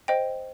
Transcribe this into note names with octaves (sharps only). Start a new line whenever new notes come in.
C5 D#5 G5